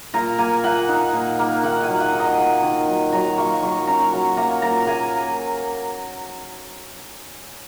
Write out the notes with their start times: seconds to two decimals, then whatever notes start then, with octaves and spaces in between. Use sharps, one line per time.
0.14 A#2 A#5
0.38 A#3 G#5
0.64 A#2 F#5
0.89 D#4
1.13 A#2
1.39 A#3
1.63 D#3 F#5
1.82 G#5
1.88 F#3
2.00 F#5
2.13 D#4
2.19 D#5
2.38 A#3
2.63 D#3
2.88 F#3
3.12 F#3 A#5
3.38 A#3 C#6
3.62 F#3 C#6
3.87 C#4 A#5
4.12 F#3 C#6
4.37 A#3 A#5
4.62 A#2 A#5
4.86 A#3 G#5